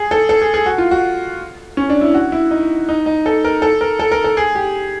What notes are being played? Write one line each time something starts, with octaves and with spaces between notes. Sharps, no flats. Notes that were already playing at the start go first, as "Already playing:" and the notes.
Already playing: G#4
A4
A4
G#4
G#4
F#4
F4
F#4
C#4
D4
E4
F#4
E4
D#4
D#4
D#4
A4
A#4
A4
A#4
A4
A#4
A4
G#4
G4